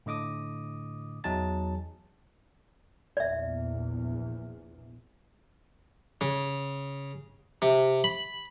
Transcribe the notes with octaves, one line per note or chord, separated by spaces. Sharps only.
A2 D3 D#5 D6 D#6
E2 F#3 D#4 G#4 A5 A6
A#1 E2 D5 E5
C#3
C3
B5